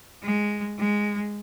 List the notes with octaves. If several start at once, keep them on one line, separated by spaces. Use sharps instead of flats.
G#3
G#3